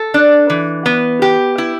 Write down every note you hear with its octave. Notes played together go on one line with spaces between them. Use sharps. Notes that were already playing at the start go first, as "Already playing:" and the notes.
Already playing: A4
D4
E3
B3
G4
E4